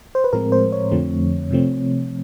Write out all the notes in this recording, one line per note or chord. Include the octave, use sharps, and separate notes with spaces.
C5
B4
A2 F3 G#3 C4 A#4
C5
C#5
F2 D3 F3 A3 C4
C3 F3 A3 C4